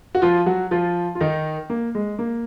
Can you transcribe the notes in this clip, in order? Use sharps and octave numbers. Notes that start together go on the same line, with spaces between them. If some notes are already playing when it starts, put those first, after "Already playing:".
F#4
F3 F4
F#3 F#4
F3 F4
F4
D#3 D#4
A#3
G#3
A#3